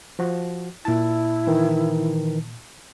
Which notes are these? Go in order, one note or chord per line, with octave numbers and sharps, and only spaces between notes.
F3 F#4
A#2 E4 A5
D#3 E3